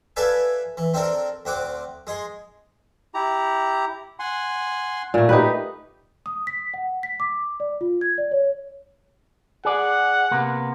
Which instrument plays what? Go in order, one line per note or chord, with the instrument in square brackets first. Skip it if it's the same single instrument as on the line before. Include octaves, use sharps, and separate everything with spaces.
[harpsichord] A4 B4 D5 E5 F5 G#5
E3
C4 D4 A4 A#4
D2 C4 F#5 D6
G#3 G#4 C6
[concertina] E4 G4 A#5
F#5 G#5 C6
[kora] A#2 A3
D#4 G4 B4
[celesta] D#6
B6
F#5
B6
D6
D5
F4
G#6
D5
C#5
[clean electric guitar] G#4 D5 [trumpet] F#5
[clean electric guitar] C3 A#3 B3